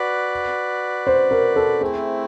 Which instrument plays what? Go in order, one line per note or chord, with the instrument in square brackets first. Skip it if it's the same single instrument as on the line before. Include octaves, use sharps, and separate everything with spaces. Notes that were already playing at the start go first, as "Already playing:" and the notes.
Already playing: [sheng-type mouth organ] F#4 B4 D5
[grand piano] C5
A#4
A4
[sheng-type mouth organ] A3 C4 E4 [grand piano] G#4